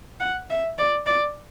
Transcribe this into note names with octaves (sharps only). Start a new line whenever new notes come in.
F#5
E5
D5
D5